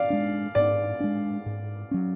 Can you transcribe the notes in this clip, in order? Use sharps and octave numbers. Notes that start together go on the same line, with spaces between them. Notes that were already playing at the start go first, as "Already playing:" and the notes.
Already playing: D5 F5
G#3 D4
G#2 D5
G#3 D4
G#2
F#3 C#4